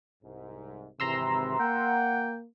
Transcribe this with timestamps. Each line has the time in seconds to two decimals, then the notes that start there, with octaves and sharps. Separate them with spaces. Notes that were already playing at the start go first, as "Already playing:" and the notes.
0.24 C2 G#2
1.00 G#1 C3 E3 A#5 C6 E6
1.60 A#3 F#5 G5